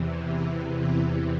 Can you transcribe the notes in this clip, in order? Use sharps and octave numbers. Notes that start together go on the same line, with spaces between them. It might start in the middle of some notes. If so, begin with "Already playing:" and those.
Already playing: E2 C3 E3
E4
E4